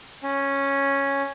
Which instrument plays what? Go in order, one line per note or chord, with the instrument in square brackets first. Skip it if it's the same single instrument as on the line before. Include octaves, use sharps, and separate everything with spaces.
[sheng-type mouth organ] C#4